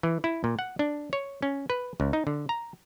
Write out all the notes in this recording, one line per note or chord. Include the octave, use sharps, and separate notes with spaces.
E3
E4
A#2
F#5
D4
C#5
C#4
B4
C#2
D#4
D3
A#5